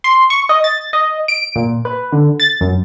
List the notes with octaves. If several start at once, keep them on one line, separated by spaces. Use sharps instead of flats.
C6
C#6
D#5
A6
D#5
D7
A#2
B4
D3
A6
F#2